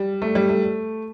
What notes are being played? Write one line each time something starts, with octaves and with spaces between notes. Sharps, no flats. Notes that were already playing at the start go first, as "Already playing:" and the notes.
Already playing: G3
A3
G3
A3